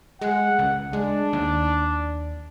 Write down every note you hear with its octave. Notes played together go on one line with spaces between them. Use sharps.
G#3 F#5
C#2
G#3 D4
D#2